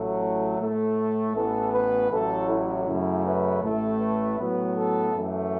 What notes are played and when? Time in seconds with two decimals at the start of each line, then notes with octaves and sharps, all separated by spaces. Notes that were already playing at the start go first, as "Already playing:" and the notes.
Already playing: A1 A2 F#3 A3 A4
0.59 A2 A3
1.35 A1 A2 E3 B3 A4
1.73 B4
2.11 A1 A2 F#3 A3 A4
2.49 E4
2.87 F#2 C#3 A3
3.25 B4
3.62 A1 A2 A3
4.01 B4
4.38 A2 F#3 B3
4.76 A4
5.14 F#2 E3 A3